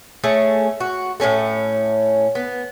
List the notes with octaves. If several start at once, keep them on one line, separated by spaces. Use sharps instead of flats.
A3 C#4 G#4
F#4
A2 C3 C#4 A4
B3